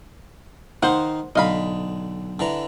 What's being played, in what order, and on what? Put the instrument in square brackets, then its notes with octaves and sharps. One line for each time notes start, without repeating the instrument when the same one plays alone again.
[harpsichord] D#3 D#4 F5 [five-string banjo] C5 F#5
[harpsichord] B1 D3 [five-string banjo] D#5 F5 B5
[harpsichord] D3 E3 A#5